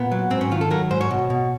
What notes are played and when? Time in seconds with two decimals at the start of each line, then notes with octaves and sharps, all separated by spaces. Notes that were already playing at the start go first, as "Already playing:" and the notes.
Already playing: A#2 B3
0.12 F#3
0.30 G#2 C4
0.41 C#4
0.51 D#3 F4
0.61 A4
0.71 F#3 A#4
0.91 G#2 C5
1.01 C#5
1.11 B2
1.30 B2